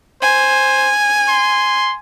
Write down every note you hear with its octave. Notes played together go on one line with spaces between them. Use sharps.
C5 G#5
C6